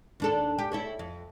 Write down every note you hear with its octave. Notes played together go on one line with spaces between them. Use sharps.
D#2 D4 A4
G4
E4 A4 C#5
F2